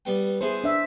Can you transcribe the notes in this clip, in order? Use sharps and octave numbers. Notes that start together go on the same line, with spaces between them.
G3 B3 G5
B3 E4 G#4 C5
D4 E5